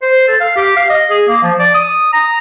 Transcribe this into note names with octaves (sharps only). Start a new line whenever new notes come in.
C5
A4
F5
G4
F5
D#5
G#4
A#3
F3
D5
D#6
A#5